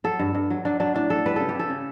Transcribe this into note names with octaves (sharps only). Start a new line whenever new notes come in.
F#3 A4
G2
G2
F#3
F#3 D4
F#3 D4
A2 D4
F#3 A4
G3 B4
C#3 A4
G4
C#3 A4
C#3